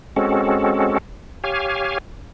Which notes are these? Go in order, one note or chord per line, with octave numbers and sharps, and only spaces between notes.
G#3 C4 C#4 F#4 A4
G4 C#5 F5 G#5